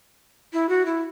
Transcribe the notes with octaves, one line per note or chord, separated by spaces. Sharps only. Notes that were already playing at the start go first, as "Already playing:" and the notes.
E4
F#4
E4